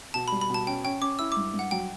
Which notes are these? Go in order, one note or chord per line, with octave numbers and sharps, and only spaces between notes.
B2 A5
G3 B5
B5
B2 A5
C#4 G5
C#4 G5
C#4 D6
E4 E6
G2 D6
G2
F#5
F#3 G5